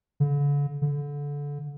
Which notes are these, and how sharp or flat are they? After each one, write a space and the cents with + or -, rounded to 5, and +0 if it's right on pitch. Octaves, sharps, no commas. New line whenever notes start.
D3 -40
D3 -25